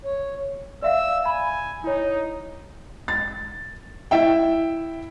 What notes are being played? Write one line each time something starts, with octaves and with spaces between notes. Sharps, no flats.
C#5
D5 E5 F5 E6
G#5 B5
D#4 E4 C#5
A6
E4 E5 G5